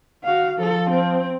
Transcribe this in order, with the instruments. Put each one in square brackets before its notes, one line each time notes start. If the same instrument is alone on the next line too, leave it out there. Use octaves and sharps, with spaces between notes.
[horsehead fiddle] F#4 F5
[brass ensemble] F3 [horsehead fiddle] A4
[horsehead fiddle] C4